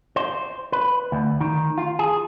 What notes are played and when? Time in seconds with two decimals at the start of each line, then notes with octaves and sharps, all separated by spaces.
0.16 C5
0.72 B4
1.12 D2
1.41 D#3
1.78 F4
1.99 G#4